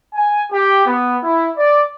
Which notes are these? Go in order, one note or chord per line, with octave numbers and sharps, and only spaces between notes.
G#5
G4
B3
E4
D5